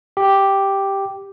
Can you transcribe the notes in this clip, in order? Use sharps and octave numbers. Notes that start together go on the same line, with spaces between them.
G4